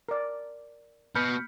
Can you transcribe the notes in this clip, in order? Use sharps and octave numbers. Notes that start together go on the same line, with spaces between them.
A#4 D5
B2 B5 F6 G6 C#7